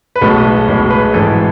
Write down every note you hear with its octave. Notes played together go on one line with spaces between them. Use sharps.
B4
B1 A2 G#3 A4
B4
B1 A2 G#3
B4
G#1 G#2 E3 A4